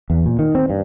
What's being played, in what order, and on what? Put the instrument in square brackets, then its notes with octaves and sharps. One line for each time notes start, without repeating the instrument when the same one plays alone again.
[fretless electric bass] E2
A#2
D#3
C4
G2